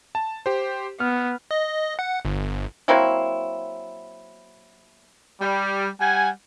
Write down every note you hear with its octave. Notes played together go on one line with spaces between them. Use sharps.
A5
G4 C5
B3 F6
D#5
F#5
G1
F#3 A#3 C4 E4
G3
G3 F#5 G#5